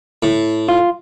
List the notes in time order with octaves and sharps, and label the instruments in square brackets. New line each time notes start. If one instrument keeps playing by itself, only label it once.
[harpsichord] A2
[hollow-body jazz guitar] F4